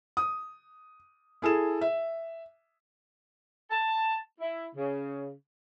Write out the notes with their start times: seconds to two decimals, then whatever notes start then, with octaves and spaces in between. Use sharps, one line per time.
0.17 D#6
1.42 E4 G#4 A4 E7
1.81 E5
3.71 A5
4.40 E4
4.76 C#3